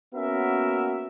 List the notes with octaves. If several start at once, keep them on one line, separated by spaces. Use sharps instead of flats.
A#3 B3 C#4 F#4 A#4 E5